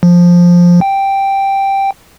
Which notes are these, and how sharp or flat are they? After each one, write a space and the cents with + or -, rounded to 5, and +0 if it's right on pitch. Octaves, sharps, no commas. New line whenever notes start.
F3 +5
G5 +0